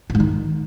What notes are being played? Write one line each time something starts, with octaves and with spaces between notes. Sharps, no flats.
B2
G#2
D#3